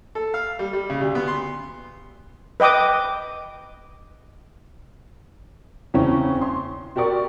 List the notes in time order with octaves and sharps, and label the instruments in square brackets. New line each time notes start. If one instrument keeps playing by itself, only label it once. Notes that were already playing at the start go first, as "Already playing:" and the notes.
[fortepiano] A4
F5
G3
G3
C#3
D2
B3
C6
[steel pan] B4 D#5 G5 D6 D#6
[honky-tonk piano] E2 C#3 E3 C4 C#4
C6
F#4 G4 A#4 D5 C#6